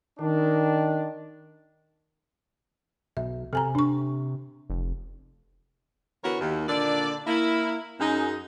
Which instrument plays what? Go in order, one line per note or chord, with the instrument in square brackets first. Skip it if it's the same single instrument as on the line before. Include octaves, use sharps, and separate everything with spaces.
[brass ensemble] D#3 D4
[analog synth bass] B1 [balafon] E5
[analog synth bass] C3 [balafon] A4 G#5 A#5
[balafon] D4 C#6
[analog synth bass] F1
[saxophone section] D3 E3 B3 F#4 A#4 C#5
D#2
A#2 D3 D4 D5
A#3 E4
F#2 D#4 G#4